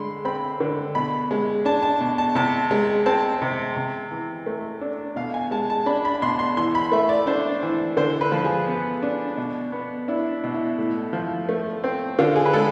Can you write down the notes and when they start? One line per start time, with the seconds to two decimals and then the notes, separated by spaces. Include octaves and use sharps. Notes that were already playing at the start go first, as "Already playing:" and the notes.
Already playing: D3 G#3 B5 C6
0.25 C4 B5
0.60 D3
0.95 B2 B5
1.31 G#3
1.65 D4 A5
1.83 A5
2.00 B2
2.18 A5
2.35 C3 A5
2.71 G#3
3.06 C4 A5
3.42 C3
3.76 C3
4.11 E3
4.46 A3
4.81 D4
5.16 B2 F5
5.34 G#5
5.51 G#3 A5
5.70 A5
5.86 D4 B5
6.05 B5
6.22 B2 C6
6.39 C6
6.57 E3 C6
6.75 B5
6.92 A3 E5
7.09 D5
7.27 D4 C5
7.63 E3
7.97 D3 C5
8.21 B4
8.32 F3
8.44 G#4
8.67 B3
9.03 D4
9.37 B2
9.72 B3
10.08 D4 E4
10.44 B2
10.54 E4
10.78 A2
11.13 F3
11.49 A3
11.84 C4
12.19 D3 F4
12.36 G#4
12.45 B4
12.53 G#3 A4